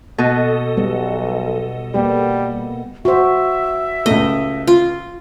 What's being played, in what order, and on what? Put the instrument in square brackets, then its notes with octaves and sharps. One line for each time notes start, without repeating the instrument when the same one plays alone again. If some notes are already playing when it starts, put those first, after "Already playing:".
[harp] B2 [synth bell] A4 D#5
[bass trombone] B1 [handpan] G3 B3
[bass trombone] G3 [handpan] A#3 B3 G4
[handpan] F#4 C5 [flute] E5
[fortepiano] C#2 A3 [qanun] D#5
[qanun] F4